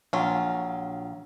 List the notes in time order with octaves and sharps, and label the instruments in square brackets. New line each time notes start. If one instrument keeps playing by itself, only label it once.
[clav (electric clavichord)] A#1 [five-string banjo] F#3 F4